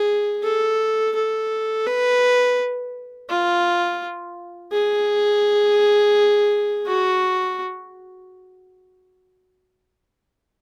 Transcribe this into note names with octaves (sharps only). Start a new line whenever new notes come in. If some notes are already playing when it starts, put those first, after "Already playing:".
Already playing: G#4
A4
A4
B4
F4
G#4
F#4